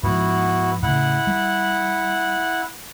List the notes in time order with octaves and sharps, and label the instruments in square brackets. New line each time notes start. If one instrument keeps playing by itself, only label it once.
[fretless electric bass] G#2 F3 [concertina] B3 E4 F#4
[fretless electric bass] A2 C#3 [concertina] E4 F#5
[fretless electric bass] G3